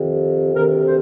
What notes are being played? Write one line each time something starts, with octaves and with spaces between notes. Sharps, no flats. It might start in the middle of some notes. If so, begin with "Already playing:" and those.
Already playing: F2 C3 D#3
D2 C3 D#3 A#4
C5